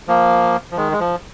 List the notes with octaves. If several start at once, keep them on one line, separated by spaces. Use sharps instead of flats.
F3 A#3
F3
D#3 G#3
G#3
F3